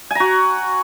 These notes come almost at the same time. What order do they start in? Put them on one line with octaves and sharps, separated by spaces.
G#5 A#5 F#4